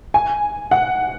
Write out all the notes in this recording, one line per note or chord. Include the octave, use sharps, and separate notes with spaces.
G#5
F#5